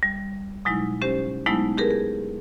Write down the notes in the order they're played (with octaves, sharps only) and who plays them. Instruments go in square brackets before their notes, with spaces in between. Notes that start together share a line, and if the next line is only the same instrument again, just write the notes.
[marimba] G3
B2 F#3 G#3 D#4 E4
C#4 G4 C5
F#3 G#3 A3 B3 D#4 E4
G4 G#4 A#4 B4
G#4